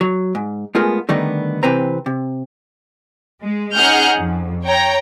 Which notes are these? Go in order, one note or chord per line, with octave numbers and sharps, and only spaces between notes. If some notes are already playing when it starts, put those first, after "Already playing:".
F#3
G#2
G#3 A3 B3 F4 G#4 A#4
D3 D#3 G3 A3 B3 D#4
C3 E3 C4 B4 C5 A#5
C3
G#3
C#4 D#4 G#4 F#5 F6 G6
F2
C#5 G5 A#5